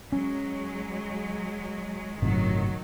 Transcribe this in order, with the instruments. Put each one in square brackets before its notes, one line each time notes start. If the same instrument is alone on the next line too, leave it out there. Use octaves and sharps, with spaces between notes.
[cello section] F#3 G#3 [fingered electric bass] C#4
[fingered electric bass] G1 A2 C3 [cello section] D#3 F#3